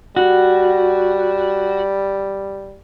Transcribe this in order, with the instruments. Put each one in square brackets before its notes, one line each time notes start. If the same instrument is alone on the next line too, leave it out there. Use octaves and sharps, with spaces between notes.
[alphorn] G3 [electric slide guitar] F#4